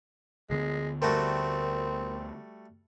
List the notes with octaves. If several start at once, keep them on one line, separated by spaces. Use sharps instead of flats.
D2 D3 G#3 B3
G3 A3 C4 F#4 A#4